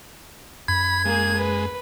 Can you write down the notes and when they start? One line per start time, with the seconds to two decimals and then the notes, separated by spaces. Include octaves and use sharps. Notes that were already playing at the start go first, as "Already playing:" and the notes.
0.68 F#2 B5 G#6
1.05 G#3 A#3 G#4
1.38 B4